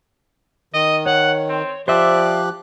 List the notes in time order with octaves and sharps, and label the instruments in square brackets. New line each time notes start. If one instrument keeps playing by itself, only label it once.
[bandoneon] D#3 [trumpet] D#5
[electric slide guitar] C#5 [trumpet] F#5
[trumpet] C4
[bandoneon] F3 G4 F#6 [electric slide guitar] C5 E5 [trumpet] D5